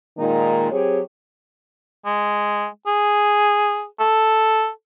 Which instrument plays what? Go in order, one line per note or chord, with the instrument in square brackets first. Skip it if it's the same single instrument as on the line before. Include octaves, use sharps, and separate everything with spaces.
[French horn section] A#2 D#3 G#3 A#3 D#4
F#3 C4 G4 G#4 C#5
[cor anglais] G#3
G#4
A4